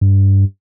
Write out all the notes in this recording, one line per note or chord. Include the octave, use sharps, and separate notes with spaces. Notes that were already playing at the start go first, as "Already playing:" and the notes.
G2